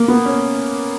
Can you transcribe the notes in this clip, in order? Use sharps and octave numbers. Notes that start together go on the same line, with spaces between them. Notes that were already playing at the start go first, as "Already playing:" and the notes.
Already playing: A#3
B3
C#4